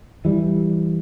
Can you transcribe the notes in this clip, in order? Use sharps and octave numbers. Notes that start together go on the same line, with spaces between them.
E3 G3